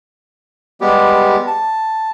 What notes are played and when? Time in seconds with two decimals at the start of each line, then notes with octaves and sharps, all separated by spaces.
0.81 G3 G#3 B3 G4
1.47 A5